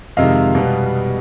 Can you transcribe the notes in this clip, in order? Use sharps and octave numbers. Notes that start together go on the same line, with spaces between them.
F2 C3 D#3 G#3 D#5 F5
B2 G3 B3